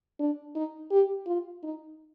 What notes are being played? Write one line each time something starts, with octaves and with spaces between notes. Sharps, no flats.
D4
D#4
G4
F4
D#4